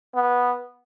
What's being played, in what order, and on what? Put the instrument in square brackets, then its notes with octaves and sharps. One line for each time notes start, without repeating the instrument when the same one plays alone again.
[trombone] B3